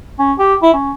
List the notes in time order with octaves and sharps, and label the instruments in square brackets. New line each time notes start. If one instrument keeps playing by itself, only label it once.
[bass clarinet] C#4
G4
E4
C#4